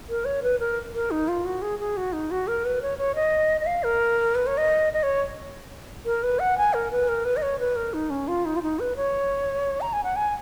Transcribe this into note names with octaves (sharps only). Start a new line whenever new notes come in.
A#4
C#5
B4
A#4
A#4
D#4
F4
F#4
G#4
G#4
F#4
D#4
F#4
A#4
B4
C#5
C#5
D#5
D#5
F5
A#4
B4
C#5
D#5
D#5
C#5
A#4
B4
F#5
G#5
A#4
B4
A#4
B4
D#5
C#5
B4
A#4
D#4
C#4
F4
D#4
F4
D#4
B4
C#5
A#5
G#5
F#5
G#5